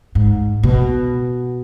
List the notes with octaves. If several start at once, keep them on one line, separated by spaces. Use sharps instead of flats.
G#2
B2